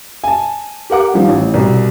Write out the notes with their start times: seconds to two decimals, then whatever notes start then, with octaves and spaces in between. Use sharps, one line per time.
0.24 G#5 A5
0.90 G4 A#4 F#5 D6
1.14 D#3 F3 G3
1.29 A1
1.54 C2 B2